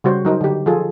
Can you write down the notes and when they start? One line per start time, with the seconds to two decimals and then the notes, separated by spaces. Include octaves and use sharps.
0.04 C#3 G3 F#4 C5 C#5
0.25 F#3 D#4 A#4 C5
0.41 D3 G4
0.66 F3 F4 G#4 A4